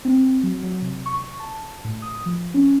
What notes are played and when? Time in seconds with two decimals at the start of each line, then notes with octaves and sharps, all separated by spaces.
0.05 C4
0.43 F#3
0.63 F#3
0.82 C3
1.06 C#6
1.40 A5
1.84 A2
2.02 D#6
2.26 F3
2.54 C#4